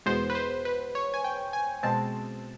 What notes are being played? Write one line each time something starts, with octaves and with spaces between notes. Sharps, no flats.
E2 B2 G#3 B3 C5
B4
C5
B4
C#5
G#5
G5
G#5
B2 G#3 C4 A5